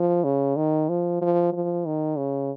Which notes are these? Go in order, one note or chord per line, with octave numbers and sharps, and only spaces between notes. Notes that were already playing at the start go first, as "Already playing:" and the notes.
Already playing: F3
C#3
D#3
F3
F3
F3
D#3
C#3